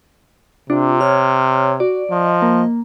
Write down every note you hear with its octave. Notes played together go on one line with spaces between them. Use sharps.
C3 D4 F4
C#5 F6
F#4 D5
F3 D#5
A#3